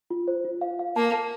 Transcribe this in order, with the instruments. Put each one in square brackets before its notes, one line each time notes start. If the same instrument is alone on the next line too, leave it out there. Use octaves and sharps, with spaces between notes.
[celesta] F4
C5
F4
F5
F5
[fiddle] A#3 [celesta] A5
[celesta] A5